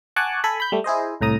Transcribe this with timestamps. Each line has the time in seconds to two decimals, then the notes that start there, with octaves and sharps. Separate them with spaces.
0.16 F#5 G#5 A5 C#6 D6 F#6
0.44 A4 G#5 B5
0.60 B5 G6
0.72 G3 A3
0.84 E4 G#4 C5 D#5
1.21 C2 A2 A#5 D#6